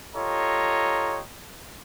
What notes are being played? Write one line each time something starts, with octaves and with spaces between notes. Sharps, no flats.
F4 G4 A4 C#5 D#5 A#5